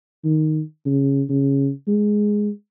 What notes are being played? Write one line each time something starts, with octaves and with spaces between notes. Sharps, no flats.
D#3
C#3
C#3
G#3